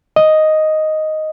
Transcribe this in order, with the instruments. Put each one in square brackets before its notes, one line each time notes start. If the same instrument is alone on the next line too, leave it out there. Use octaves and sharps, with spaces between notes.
[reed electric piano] D#5